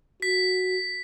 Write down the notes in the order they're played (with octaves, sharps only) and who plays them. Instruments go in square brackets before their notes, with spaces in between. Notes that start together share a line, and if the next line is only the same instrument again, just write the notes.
[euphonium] F#4 [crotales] B6